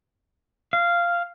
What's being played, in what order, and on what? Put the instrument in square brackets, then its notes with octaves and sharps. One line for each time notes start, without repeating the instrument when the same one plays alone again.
[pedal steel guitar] F5